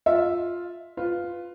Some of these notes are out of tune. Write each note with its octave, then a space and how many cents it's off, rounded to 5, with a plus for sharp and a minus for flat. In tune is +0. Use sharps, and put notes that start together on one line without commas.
F4 +5 E5 +0
F4 +0 B4 +15